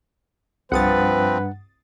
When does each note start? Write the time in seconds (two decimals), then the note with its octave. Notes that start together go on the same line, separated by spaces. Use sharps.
0.72 C2 G2 F3 C4 B4 F#5 D#6 A6